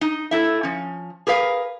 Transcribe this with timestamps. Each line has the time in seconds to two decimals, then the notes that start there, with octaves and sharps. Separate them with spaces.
0.01 D#4
0.31 A3 E4 E5
0.63 F3 C#4
1.27 G#4 A#4 B4 F5